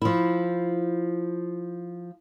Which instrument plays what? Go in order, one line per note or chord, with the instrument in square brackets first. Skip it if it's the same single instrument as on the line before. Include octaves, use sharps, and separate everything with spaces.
[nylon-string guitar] F3 E4